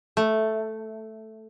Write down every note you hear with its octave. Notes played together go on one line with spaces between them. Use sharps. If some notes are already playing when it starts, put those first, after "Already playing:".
A3